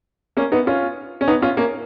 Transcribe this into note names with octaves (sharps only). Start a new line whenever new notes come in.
A#3 C#4
B3 D#4
C#4 F4
C#4
B3 D#4
C#4 F4
A#3 C#4